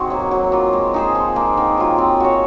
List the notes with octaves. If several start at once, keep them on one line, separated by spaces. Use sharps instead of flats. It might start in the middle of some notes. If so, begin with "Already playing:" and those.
Already playing: C4 D#4 F#4 G#4
F#3 A#3
F#3
A#3 F4
G#3
D#4 G#4 C5
F3
A#3 D#4
D#3
F#3 C4 F4
C4
F#4 C#5